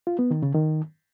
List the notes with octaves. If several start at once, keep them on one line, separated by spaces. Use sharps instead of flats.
F4
B3
D#3
C#3
D#3